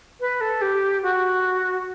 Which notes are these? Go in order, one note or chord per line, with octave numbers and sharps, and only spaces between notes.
B4
A4
G4
F#4